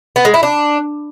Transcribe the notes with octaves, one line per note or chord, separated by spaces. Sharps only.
B3
G#3
E4
D4